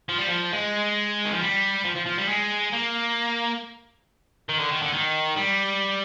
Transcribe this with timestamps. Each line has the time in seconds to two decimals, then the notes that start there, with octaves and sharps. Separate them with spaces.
0.09 F3
0.18 G3
0.29 F3
0.53 G#3
1.25 D#3
1.32 F3
1.41 G3
1.85 F3
1.96 F3
2.06 F3
2.18 G3
2.28 G#3
2.73 A#3
4.49 D#3
4.60 D3
4.72 D#3
4.82 D3
4.93 D#3
5.37 G3